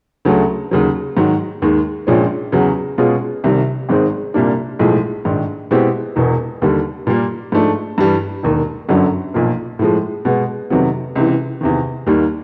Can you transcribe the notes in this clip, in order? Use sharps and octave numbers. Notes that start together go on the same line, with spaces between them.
D2 C#3 F#3 A3
D#2 C#3 F#3
G#2 D#3 F#3
D#2 D#3 G#3
A#1 A#2 F3 G#3 C#4
E2 C#3 F#3
B2 G#3 C#4 F4 G#4
C2 C3 D#3 G3
G#1 G#2 D#3 G#3 C4
C2 A#2 G3 A#3 D4
B1 A2 F3 G#3
A#1 G#2 D#3
B2 G#3 C4 E4 G4
E1 E2 B2
D#2 D3 G3
A#2 G3 A#3
G#2 F3 A3 D4
G2 E3 G3
E1 D#2 D#3
G1 F#2 D3 F#3
B1 A#2 F3 A#3
A2 F3 G#3
B2 G#3 B3
F2 C3 D#3 F#3 B3
C#2 C3 E3
E2 C3 D#3
D#2 D#3 G3 A#3